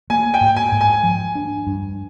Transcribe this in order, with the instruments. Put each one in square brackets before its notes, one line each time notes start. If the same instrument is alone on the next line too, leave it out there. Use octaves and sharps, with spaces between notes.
[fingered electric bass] A#3 [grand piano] G#5
[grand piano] G5
[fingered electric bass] G#2
[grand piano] G#5
[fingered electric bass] G#2
[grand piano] G#5
[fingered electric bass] F3
D4
G2